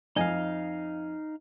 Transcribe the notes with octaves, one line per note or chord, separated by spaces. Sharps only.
F2 D#4 D#5 F5 G#5